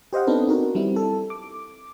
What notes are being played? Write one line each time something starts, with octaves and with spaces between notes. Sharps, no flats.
G4 C5 D#5 F5 F#5
B3 C4 D4 D#4 A4 B4
D#4 F#4 A#4
G3 C4 E4
A4
D6